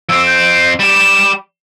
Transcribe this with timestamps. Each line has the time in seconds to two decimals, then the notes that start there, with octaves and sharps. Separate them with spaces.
0.09 F2 C4 E6
0.27 G6
0.79 G3 G4 E7